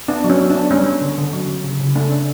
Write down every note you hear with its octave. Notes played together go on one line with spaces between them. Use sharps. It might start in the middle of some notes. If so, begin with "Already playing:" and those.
B3 D4
F#3
C#4
F#3
D4
B3
G3 C#4
C#4
D3
D3
F#3
C#4
C#3
C#3
A3 D4
C#4